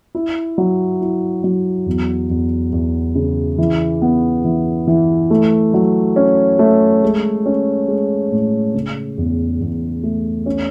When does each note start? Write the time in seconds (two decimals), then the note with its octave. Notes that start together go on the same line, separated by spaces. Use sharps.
0.15 E4
0.58 F#3
1.01 E4
1.44 F#3
1.86 E2
2.30 E2
2.72 E2
3.15 C#3
3.58 E3
4.02 B3
4.44 E3
4.87 E3
5.30 A3
5.74 F#3
6.16 C#4
6.59 A3
7.03 G#3
7.46 C#4
7.88 G#3
8.32 A2
8.74 C#3
9.18 E2
9.61 E2
10.03 A3
10.46 C#4